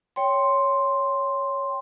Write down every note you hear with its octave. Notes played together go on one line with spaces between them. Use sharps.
C#5 G5 C6